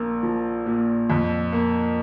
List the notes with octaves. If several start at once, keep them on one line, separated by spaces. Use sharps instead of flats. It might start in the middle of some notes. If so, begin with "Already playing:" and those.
Already playing: A#1 A#3
F3
A#2
F2
A#3